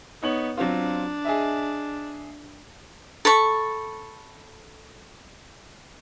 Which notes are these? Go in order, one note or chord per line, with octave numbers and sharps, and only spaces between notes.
B3 D#4 C#5 F#7
F#3 C4 D4 F4
G#4 D#5 E5
A4 B5 C#6